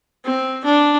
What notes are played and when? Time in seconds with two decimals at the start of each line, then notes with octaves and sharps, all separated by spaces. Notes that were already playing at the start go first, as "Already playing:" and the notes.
0.25 C4
0.65 D4